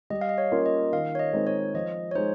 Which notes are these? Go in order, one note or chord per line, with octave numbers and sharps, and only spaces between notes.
G3 D#5
F5
D#5
C#5
A#3 C#4 F4 A#4
D#5
D#3 F5
C#5
D#5
G#3 C4 D#4 A#4
C#5
F3 D#5
C#5
G#3 D#4 C5